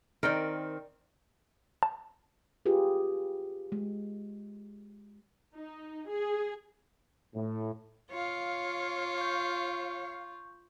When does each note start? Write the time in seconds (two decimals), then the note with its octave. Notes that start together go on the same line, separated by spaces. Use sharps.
0.23 D#3 C4 A#4 D5 G5
1.83 A5
2.66 F4 G4 G#4 B4
3.72 G#3
5.55 D#4
6.09 G#4
7.35 A2
8.11 F4 C#5 F5
9.18 C#6 G6